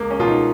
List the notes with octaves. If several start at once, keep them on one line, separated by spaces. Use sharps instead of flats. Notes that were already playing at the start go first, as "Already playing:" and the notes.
Already playing: C#2 A#3
C#4
B2 F4
D#4